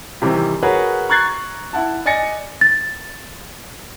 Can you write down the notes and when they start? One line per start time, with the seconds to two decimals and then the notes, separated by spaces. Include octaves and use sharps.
0.22 C3 D#3 E3 G3 C4
0.63 F#4 G#4 A#4 B4 C#5
1.09 A#5 C#6 F#6 G#6 A6 C7
1.73 E4 F#5 A5
2.06 D5 D#5 G#5 A6 A#6 C#7
2.61 A6